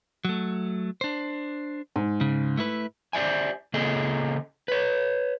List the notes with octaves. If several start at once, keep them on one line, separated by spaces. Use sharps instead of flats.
F#3 A3
D4 C5
G#2
C#3
A3 E4 B4
G4 C5 D5 E5 G#5
C#3 A#3 G#4 A4 D#5
B4 C#5